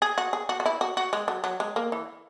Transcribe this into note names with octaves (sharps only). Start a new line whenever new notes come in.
G#4
F#4
G#4
F#4
F#4
E4
F#4
F#4
G#3
F#3
F#3
G#3
A#3
E3